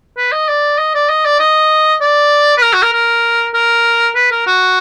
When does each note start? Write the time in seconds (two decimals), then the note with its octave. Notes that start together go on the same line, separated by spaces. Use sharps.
0.18 B4
0.32 D#5
0.48 D5
0.78 D#5
0.95 D5
1.09 D#5
1.25 D5
1.40 D#5
2.01 D5
2.57 B4
2.62 A#4
2.73 F#4
2.82 A#4
2.93 A#4
3.54 A#4
4.15 B4
4.32 A#4
4.47 F#4